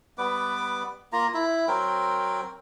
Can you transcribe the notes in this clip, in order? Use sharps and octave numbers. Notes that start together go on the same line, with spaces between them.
G3 B3 B4 D6
A#3 F4 A#5
E4 E5
F#3 C4 A#4 G5